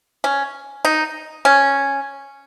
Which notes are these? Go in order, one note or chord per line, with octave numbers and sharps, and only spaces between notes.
C#4
D#4
C#4